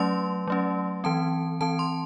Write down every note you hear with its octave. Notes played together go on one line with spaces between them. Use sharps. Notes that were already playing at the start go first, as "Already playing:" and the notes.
Already playing: F#3 A3 C#4 C6
F#3 A3 C#4
E3 C4 A5
E3 C4 A5
C6